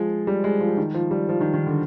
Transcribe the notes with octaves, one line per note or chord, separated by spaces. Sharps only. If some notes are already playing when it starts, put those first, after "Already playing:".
Already playing: F3 G#3
G3
G#3
F3
D#3
F3
G3
F3
D#3
D#3
D3